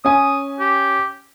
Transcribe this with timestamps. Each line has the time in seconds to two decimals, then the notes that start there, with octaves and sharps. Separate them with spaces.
0.05 C#4 G#5 D#6
0.60 G4